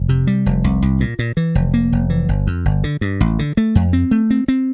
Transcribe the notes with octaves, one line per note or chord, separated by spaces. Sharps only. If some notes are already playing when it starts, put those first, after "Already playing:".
Already playing: F1
C3
G3
F1
C2
C2
A#2
A#2
E3
F1
A#3
F1
E3
G1
F2
G1
D3
G2
A1
D3
A3
F2
C4
A3
C4
C4